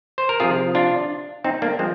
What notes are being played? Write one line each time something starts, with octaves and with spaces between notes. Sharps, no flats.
C5
A#4
C3 F3 F4 G#4
D4 F4
C4 D#4
A#3 D4
F3 G#3 C4